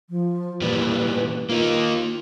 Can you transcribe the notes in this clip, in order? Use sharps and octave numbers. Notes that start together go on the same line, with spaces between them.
F3
A#2 E3 G3 B4
A#3 D#4 F4